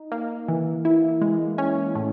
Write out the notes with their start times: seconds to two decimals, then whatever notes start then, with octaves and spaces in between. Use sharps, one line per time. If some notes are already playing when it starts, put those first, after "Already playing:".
Already playing: D#4
0.12 A#3
0.48 E3
0.85 E4
1.22 G#3
1.58 C#4
1.95 A2